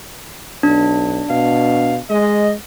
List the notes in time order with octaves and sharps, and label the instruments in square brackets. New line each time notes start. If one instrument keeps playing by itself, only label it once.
[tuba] B1 [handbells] D4
[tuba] B2 [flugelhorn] F5
[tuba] G#3 [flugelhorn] D#5